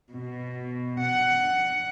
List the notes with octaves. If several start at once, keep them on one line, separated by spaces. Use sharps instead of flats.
B2
F#5